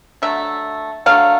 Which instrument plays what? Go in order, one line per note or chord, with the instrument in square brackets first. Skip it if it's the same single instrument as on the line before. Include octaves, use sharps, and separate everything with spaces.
[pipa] D3 F#3 A3 E5
D3 F#3 A3 F5